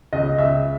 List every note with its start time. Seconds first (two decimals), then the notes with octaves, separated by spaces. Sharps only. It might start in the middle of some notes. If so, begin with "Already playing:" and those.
0.13 C#2 D#5
0.38 C#2 E5